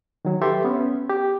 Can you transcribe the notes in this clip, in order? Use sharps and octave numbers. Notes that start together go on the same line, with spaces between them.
D#3 F#3
G4 A4 B4 E5 C6
B3 C#4
G4